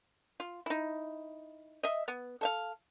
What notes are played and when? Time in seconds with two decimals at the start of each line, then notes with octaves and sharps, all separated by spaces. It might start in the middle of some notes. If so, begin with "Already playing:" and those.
0.40 F4
0.66 D#4 E4
1.83 D#5 E5
2.08 B3
2.41 A4 E5 F5